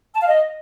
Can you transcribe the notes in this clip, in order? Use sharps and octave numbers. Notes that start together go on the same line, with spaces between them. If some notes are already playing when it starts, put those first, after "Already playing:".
A5
F5
D#5